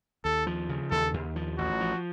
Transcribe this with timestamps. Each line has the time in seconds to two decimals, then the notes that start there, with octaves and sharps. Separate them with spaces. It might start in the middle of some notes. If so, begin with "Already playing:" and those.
0.24 D#2 A4
0.47 F3
0.69 C#3
0.91 D#2 A4
1.14 D#2
1.36 F3
1.58 A1 F#4
1.81 F3